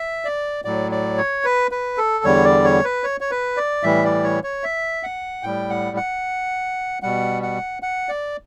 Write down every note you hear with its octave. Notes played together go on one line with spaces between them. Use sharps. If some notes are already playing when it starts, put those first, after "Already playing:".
Already playing: E5
D5
A2 F#3 D5
D5
C#5
B4
B4
A4
E2 D3 G3 C#5
D5
C#5
B4
C#5
C#5
B4
D5
A2 E3 G3 E5
D5
C#5
C#5
E5
F#5
A2 G3 G5
F#5
F#5
B2 G3 F#5
F#5
F#5
D5